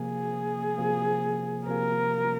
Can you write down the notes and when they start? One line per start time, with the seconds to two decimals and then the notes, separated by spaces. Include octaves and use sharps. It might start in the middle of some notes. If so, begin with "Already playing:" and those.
Already playing: C3 F3 A#3 G#4
0.78 C3 F3 A#3
1.67 C3 F3 A#3 A#4